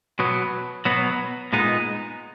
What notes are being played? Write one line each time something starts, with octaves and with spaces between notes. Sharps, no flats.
B2 F#3 B3
B2 F#3 B3
A#2 G#3 B3 D#4